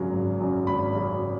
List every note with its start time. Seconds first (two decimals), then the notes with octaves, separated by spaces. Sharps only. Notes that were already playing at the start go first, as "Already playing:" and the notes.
Already playing: G#1 F#2 C#3 F#3
0.13 G#1
0.40 F#2 C#3 F#3
0.67 G#1 B5
0.95 F#2 C#3 F#3